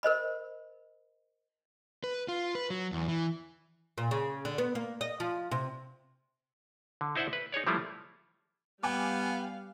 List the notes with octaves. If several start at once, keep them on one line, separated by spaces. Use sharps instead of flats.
A#4 C5 D#5 B5
B4
F4
B4
F#3
E2
E3
A#2
C#3
D3
B3
A#3
D#5
F3
C3
D3
D#4 E4 C5 D5 E5 F#5
B4
D#4 G#4 C#5 D5
F3 G3 A3 A#3 E4 F4
G3 B3 F5 G5 G#5 D6